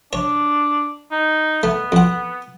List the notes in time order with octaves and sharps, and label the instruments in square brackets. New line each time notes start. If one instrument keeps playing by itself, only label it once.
[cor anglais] D4 [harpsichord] C#5
[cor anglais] D#4
[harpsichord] A3 [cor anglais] B3
[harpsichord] F2 F#5